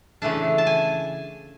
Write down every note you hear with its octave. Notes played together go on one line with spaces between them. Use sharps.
C#3 E3 A3 D4 A5
A5
G#5